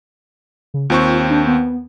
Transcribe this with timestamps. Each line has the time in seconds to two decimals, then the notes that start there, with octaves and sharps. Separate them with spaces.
0.74 C#3
0.90 D#2 C4 F4 C#6
1.30 D4
1.47 B3